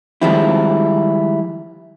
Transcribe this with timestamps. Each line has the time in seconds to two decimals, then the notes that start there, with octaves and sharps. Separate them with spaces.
0.22 D#3 F3 G3 G#3 C4 E4